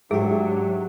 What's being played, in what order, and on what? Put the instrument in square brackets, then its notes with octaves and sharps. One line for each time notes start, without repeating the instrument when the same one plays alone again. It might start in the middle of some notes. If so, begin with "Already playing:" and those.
[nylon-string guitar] G#2 [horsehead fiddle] F#3 D4 [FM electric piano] G4 E5 [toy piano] G#4